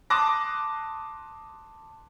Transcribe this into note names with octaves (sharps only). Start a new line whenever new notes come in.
A5 C6 D6 D#6 F#6 A#6